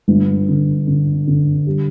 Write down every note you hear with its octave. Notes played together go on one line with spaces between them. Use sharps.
G1
D3
D3
D3
G3